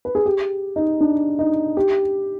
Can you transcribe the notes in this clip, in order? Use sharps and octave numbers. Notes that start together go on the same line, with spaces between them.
B4
G#4
G4
D#4
D4
D#4
G4